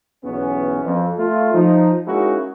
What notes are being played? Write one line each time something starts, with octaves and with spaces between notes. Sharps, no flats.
B1 E2 B3 C#4
F2
A3 F4
F3 D#4
G#3 A#3 C#4 D#4 E4 F#4